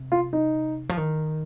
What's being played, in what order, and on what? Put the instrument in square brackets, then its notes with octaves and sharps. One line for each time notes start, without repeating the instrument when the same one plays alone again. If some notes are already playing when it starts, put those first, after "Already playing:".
Already playing: [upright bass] C3
[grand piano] F4
D#4
[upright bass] F3
D#3